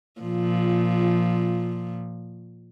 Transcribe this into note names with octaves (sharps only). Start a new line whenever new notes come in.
A#2 F3